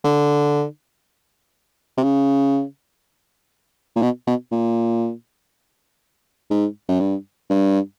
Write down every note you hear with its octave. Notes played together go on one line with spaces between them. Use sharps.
D3
C3
C#3
A#2
B2
B2
A#2
G#2
F#2
G2
G2